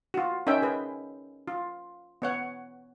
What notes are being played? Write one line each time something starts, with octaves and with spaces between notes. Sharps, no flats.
F4 F#4
C#4 D#4 A#4 E5 G5
G#4 B4
F4
B3 C#5 F#5